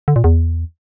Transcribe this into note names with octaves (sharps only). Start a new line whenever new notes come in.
D3
A#2
E2